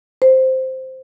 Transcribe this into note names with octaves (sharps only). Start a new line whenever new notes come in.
C5